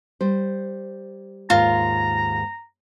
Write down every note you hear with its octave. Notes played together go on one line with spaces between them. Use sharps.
G3 C5
D#2 G#2 F4 A#5